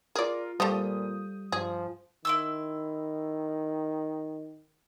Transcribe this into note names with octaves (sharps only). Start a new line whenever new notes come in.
F4 G#4 A#4 D5
A#2 F3 G3 A3 D#6 G6
G2 F3 G#4
D#3 E4 C6 E6